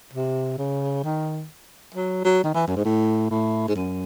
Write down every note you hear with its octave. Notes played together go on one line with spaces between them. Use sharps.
C3
C#3
D#3
F#3
F#3
D#3
E3
F#2
G#2
A2
A2
G#2
F#2